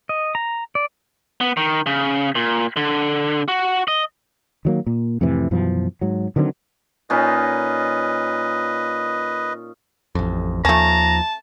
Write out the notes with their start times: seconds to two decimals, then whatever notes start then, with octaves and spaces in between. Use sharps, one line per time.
0.09 D#5
0.35 A#5
0.75 D5
1.41 B3
1.57 D#3
1.86 C#3
2.35 A#2
2.77 D3
3.48 F#4
3.88 D#5
4.65 D#3 F#3 A#3
4.87 A#2
5.21 F2 A2 C3 E3
5.51 F#2 B2 E3 F3
6.01 G#2 F#3
6.36 D3 D#3 F#3 C4
7.10 A#2 C#4 D#4 B4 D#5
10.15 A1 F2
10.65 D#2 F3 A3 C#4 A5 A#5